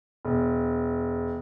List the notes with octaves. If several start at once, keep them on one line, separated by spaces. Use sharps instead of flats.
E1